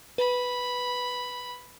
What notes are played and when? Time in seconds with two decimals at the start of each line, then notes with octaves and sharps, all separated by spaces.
0.18 B4 B5